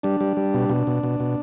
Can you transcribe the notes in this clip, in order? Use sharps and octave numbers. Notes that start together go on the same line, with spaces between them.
G3 D4
G3
G3
B2
B2
B2
B2
B2